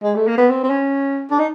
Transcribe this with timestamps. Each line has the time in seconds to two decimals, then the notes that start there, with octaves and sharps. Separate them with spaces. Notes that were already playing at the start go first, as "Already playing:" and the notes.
0.03 G#3
0.16 A3
0.27 A#3
0.38 B3
0.50 C4
0.63 C4
0.70 C#4
1.31 D4
1.39 D#4